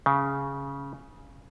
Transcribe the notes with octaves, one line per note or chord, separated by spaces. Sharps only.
C#3